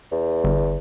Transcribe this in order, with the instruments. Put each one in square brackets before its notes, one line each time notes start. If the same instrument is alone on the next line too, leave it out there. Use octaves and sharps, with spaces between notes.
[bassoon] E2
[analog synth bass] G1